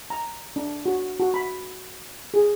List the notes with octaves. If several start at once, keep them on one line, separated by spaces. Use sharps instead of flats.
A#5
D4
F#4
F#4
B5
G#4